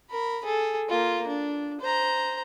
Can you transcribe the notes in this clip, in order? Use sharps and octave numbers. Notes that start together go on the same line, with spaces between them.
A#4 B5
G#4 A4
A#3 F4
D4
C5 A#5